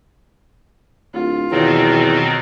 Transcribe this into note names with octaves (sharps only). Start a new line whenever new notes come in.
D1 F4
E2 B2 D#3 F#3 C4